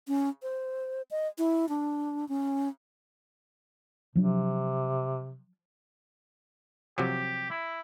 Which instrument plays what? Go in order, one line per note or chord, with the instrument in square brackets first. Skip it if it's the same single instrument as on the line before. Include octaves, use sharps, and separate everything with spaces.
[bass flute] C#4
C5
D#5
E4
D4
C#4
[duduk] C3 [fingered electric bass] F3 F#3 D4
[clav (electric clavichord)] C3 F3 F#3 [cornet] G4
[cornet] E4